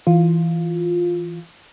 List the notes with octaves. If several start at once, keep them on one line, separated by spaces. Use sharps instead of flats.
E3 F4